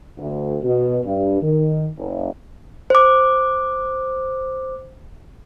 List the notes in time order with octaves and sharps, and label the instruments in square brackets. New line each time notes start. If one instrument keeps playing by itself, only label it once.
[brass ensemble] D2
B2
G2
D#3
F#1
[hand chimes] C5 D6